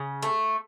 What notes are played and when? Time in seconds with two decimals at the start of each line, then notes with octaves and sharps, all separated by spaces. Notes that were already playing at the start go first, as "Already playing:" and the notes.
Already playing: C#3
0.23 A3